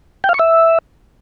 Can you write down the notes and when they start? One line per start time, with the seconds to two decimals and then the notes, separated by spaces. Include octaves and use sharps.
0.24 G5
0.29 F5
0.34 C#6
0.39 E5